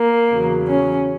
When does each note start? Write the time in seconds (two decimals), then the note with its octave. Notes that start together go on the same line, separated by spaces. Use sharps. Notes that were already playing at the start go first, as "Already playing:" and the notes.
Already playing: A#3
0.29 E2 C#3 F#3
0.69 C#4